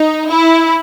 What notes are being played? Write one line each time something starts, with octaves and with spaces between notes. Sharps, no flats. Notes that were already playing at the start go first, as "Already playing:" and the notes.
Already playing: D#4
E4